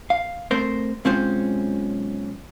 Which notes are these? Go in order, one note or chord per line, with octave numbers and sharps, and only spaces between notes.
F5
A3 C4 A#4 C5
B1 G#3 C4 C#4 F4 C5